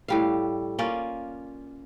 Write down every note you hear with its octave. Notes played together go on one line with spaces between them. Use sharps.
A2 G3 F5
A#3 C#4 F4 D5